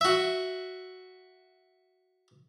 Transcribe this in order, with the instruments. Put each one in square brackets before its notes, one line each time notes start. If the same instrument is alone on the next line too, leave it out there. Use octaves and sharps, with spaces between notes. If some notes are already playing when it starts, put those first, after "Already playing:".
[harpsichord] F#4 E5